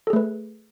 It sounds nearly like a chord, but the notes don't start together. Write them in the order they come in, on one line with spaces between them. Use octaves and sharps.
A4 G#4 A3 B4